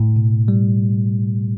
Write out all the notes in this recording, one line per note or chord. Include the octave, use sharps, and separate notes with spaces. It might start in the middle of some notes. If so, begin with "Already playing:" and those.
Already playing: A2
B2
G3